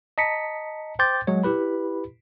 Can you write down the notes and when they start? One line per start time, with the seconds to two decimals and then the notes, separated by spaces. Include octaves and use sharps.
0.18 D#5 A5 A#5 B6 C#7
0.99 C5 G5 C6 D6 G6 A6
1.27 F#3 G#3 C#5
1.44 E4 G4 B4 B5